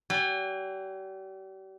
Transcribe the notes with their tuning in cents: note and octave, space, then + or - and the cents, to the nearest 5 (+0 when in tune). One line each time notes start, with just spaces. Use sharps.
G3 -40 G#5 -45